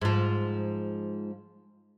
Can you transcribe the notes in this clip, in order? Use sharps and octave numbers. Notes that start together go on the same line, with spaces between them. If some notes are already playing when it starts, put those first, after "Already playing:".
G#2 F3